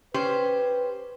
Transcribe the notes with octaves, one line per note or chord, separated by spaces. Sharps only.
C#4 G4 B4 C5